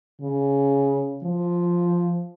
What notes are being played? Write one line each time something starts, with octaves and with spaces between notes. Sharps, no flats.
C#3
F3